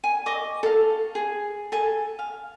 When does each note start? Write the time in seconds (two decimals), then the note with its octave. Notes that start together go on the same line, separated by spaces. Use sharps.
0.04 G#5
0.26 D#5 C#6 D6
0.63 A4 F5
1.15 G#4
1.72 A4 G#5
2.19 F5